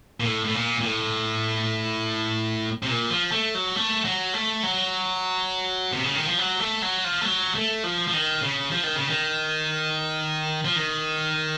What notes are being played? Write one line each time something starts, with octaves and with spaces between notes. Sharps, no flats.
A#2
A2
A2
A#2
A#2
A2
C3
A#2
F3
A3
F#3
A3
F#3
A3
F#3
C3
C#3
D#3
F3
F#3
A3
F#3
F3
A3
F#3
A3
F3
F3
D#3
C#3
F3
D#3
C#3
D#3
F3
D#3